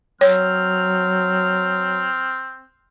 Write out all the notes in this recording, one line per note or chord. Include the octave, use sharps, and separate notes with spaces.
F#3 C4 C#5 F6